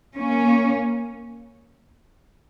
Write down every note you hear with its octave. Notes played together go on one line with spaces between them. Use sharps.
A#3 C#4